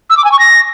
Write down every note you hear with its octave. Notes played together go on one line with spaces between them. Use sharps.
E6
D6
G#5
C#6
A#6